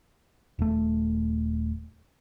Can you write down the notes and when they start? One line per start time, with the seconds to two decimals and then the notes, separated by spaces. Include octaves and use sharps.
0.59 D#1 A3